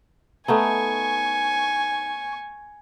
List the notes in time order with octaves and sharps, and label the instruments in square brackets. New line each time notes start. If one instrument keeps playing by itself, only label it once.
[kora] A3 B3 D#4 [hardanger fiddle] G#5 C#6